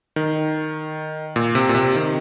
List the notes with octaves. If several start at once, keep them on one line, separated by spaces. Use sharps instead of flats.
D#3
A#2
C3
A#2
C3
D#3